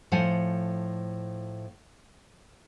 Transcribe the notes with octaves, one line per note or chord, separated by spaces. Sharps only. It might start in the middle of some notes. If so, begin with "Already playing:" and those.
A2 F3 C5 F#5 G#5